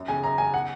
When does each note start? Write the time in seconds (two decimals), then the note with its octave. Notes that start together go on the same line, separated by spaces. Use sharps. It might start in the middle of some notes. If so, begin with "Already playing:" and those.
Already playing: F#2
0.08 C#3 G#5
0.23 F#2 A#5
0.38 C#3 G#5
0.54 F#5